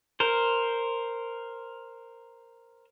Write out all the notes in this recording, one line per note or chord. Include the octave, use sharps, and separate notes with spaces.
A#4 C5